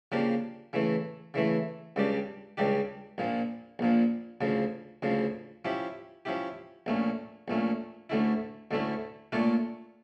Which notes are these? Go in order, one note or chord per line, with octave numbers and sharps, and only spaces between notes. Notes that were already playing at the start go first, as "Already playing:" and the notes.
C#3 F3 A#3 D4 G4
C#3 E3 A3 E4
C#3 E3 A3 E4
C#2 C#3 G3 D4 G4
C#2 C#3 G3 D4 G4
A#1 A#2 F3
A#1 A#2 F3
D2 C#3 F3
D2 C#3 F3
F3 C#4 E4 G4
F3 C#4 E4 G4
A#1 A#2 A3 C#4
A#1 A#2 A3 C#4
D2 D3 A3 C#4 E4
D2 D3 A3 C#4 E4
A#2 A3 D4 F4 C#5